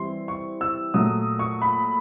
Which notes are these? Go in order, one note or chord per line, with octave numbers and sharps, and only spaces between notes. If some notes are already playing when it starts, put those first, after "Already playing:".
Already playing: E3 G3 C4 E4 C6
C#6
E6
A#2 F#3 A3 D#6
C#6
B5